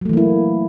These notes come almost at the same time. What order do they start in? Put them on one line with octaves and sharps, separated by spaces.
F#3 A3 E3 A#3 E4